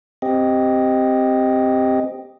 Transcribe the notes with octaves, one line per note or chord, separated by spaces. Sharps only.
C4 G4 D#5